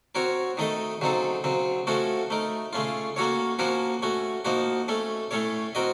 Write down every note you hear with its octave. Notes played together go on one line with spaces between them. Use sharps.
C4 F#4 A#4 C#5
D#3 A3 D#4 A4 D#5
C#3 F#3 C4 D#4 A4
C#3 F#3 C4
F3 A3 C#4 F#4 A4
A3 D#4 A#4
C#3 A3 C#4 F4
A#3 C#4 F#4 A4 C#5
F3 A#3 C#4 F#4 A#4
A3 C#4 F#4
F3 A#3 D#4 F#4
A3 C#4 A4
A2 A3 C#4 A4 C#5
C4 F#4 A#4 D#5